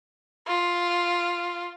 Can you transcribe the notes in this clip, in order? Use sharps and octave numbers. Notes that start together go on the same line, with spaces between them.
F4